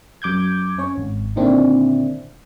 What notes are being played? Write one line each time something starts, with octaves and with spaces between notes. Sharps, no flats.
F#2 D6 G6 G#6
C#4 C#5
G#1
A#2 D3 D#3 C4 D4 E4